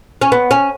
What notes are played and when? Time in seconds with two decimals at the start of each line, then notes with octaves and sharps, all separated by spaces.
0.22 C#4
0.32 B3
0.51 C#4